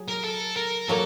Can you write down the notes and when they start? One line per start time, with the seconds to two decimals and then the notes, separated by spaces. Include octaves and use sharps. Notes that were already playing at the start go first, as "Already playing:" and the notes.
Already playing: F#3 G#4
0.08 A#4
0.24 A4
0.57 A#4
0.89 F#3 A#3 A4